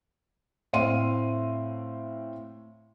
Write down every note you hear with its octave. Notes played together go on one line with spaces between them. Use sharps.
A2 C4 F5 C6 D#7